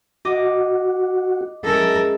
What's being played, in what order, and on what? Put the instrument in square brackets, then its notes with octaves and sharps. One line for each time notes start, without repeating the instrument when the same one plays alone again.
[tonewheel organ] F#4 [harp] D#5 D6
[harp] G#3 C#4 E4 [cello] A4 A#4